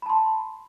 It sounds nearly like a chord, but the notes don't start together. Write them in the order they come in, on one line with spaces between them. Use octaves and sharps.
B5 A5 C6